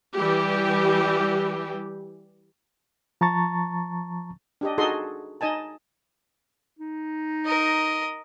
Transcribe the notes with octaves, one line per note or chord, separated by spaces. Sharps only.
E3 G3 G4
F3 A5 A#5 C#6 A6
D4 G4 D#5
D#4 F#4 G#4 A4 D#5 C6
D#4 D#5 G#5 A5
D#4
A#4 D#5